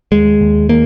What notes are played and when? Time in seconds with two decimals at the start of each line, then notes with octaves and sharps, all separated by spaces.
0.12 D#2 G#3
0.41 D#2
0.69 D#3 A#3